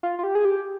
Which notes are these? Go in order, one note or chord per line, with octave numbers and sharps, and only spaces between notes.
F4
F4
G4
G#4
G4